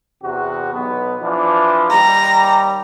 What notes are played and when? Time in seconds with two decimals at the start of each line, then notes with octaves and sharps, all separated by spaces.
0.23 E2 C3 F#4
0.74 B1 B3
1.22 E3 F3 D4
1.90 D#2 G3 A#5